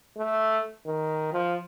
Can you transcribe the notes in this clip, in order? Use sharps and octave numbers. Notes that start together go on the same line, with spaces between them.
A3
D#3
F3